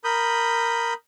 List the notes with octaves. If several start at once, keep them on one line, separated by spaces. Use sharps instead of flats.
A#4 B5 D#6 G6